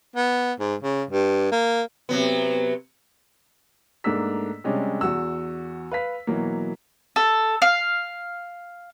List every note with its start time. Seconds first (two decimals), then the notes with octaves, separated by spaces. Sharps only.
0.16 B3
0.60 G#2
0.83 C#3
1.10 G2
1.52 A#3
2.09 C3 F#3 B3
4.04 G#2 A3 A#3 D4 E6 B6
4.64 C3 G3 G#3 C#4 D4
5.01 E2 F#4 E6
5.92 B4 F5 B6
6.27 B2 E3 F#3 A#3
7.16 A4
7.62 F5